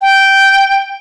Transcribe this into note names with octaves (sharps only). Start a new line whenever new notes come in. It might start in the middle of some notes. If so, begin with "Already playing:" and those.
G5